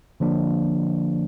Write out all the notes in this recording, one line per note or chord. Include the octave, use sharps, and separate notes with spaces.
D3 F3 A#3 D4